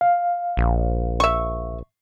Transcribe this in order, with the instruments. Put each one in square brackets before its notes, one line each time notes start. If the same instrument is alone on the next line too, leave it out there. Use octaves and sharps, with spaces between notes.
[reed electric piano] F5
[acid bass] A#1
[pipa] E5 C#6